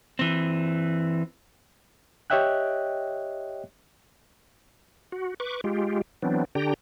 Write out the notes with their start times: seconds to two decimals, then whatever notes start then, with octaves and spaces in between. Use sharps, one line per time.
0.19 E3 C4
2.30 G4 C#5 D#5 E5 G5 F#6
5.12 F#4
5.40 B4 C#6 D6
5.64 G#3 F4 G4
6.22 E3 F#3 B3 C4 D4
6.55 D3 D4 G4 G5 A#5